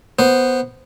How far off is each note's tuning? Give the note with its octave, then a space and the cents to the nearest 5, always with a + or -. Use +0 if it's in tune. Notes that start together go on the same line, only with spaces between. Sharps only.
B3 +0 C5 +0